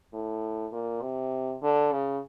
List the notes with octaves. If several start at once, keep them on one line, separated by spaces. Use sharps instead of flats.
A2
A#2
C3
D3
C#3